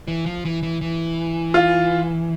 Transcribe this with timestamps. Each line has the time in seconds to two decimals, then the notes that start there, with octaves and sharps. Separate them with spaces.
0.08 E3
0.26 F3
0.45 E3
0.63 E3
0.81 E3
1.54 F4